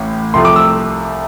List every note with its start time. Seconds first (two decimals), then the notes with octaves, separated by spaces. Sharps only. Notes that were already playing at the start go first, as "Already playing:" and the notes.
Already playing: A1 A2
0.34 C2 C3 F3 A3 C6
0.45 D6
0.56 E6